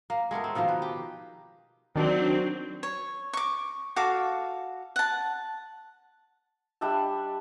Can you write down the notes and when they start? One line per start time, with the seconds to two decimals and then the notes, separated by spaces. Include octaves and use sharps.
0.10 A#3
0.31 G#3 A3 B3 A#4
0.44 C4
0.55 B2 D#3 F3 A#3
0.68 B4
0.82 G4
1.96 D#3 F#3 C4 D4
2.83 C#5
3.33 C#6 D6
3.96 F#4 A4 F5 D6
4.96 F#5 A5
6.81 G3 D4 E5 A5